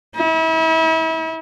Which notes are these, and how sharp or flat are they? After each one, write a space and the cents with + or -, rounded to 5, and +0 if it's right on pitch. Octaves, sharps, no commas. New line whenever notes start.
E4 -35